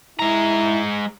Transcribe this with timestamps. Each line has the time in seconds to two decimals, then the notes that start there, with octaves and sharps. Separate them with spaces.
0.19 G#3 E4 A#5